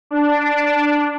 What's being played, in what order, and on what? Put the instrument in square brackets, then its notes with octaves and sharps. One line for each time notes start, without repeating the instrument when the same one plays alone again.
[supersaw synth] D4